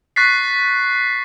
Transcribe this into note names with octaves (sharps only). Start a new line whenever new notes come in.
C#6 F#6 A6 B6 C7